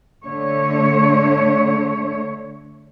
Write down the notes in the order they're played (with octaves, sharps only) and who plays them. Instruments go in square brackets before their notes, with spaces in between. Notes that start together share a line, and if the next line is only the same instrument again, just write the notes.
[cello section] D3 A3 C#5